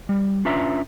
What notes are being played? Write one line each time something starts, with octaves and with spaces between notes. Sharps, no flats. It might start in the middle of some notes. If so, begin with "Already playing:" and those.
G3
C#4 D4 F4 B4 E5 A#5